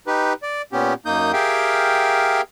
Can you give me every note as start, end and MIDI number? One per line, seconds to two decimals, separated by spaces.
0.07 0.33 63
0.07 0.33 67
0.07 0.33 71
0.43 0.62 74
0.73 0.94 46
0.73 0.94 59
0.73 0.94 61
0.73 0.94 67
1.06 1.32 42
1.06 1.32 58
1.06 1.32 63
1.06 1.32 87
1.06 1.32 91
1.33 2.41 67
1.33 2.41 68
1.33 2.41 70
1.33 2.41 76
1.33 2.41 77
1.33 2.41 79